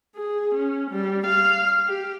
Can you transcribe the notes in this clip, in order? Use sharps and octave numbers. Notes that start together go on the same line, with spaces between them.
G#4
C#4
G3
F5
G4